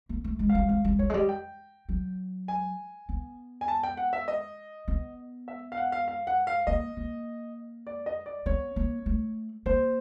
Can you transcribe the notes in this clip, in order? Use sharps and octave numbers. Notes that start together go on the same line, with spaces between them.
A#3
A3
G#3
F5
G3
G#3 F5
G3
G3 C#5
G#3
G3 D#5
G5
F#3
G#5
B3
G#5
A5
G5
F#5
E5
D#5
B3
E5
F5
F#5
F5
F5
F#5
F5
A#3 D#5
A#3
D5
D#5
D5
B3 C#5
A#3
A3
A#3 C5